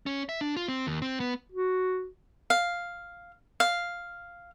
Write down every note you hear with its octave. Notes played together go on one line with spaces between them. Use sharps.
C#4
E5
D4
F4
C4
D#2
C4
B3
F#4
F5
F5